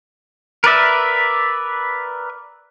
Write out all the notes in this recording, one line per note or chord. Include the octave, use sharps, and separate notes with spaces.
A#4 B4 D5 E5